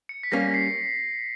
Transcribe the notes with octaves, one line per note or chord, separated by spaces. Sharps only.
C#7
B6
G3 A#3 C#4 A#6
C7